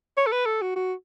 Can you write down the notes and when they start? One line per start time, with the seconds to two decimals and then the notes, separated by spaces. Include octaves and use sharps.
0.17 C#5
0.27 A4
0.32 B4
0.46 A4
0.62 F#4
0.76 F#4